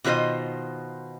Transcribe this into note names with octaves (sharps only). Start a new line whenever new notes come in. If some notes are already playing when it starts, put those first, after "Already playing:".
B2 D#3 F4 B4 C5 D#5